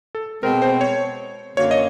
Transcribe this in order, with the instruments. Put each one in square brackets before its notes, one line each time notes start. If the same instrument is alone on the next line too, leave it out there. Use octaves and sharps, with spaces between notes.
[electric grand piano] A4
[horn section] B2 G#3 C4 [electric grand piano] A#4
[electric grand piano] C5
C#5
[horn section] F#2 D3 F#3 A#3 [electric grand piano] C#5
[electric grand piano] D#5